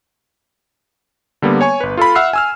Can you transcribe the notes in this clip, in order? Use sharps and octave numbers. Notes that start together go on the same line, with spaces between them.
D3 G3 A#3 B3
C#5 G#5 C#6
G1 B4
F4 A4 F5 B5
E5 F#5 E6 F6 C7
G#5 E6 F6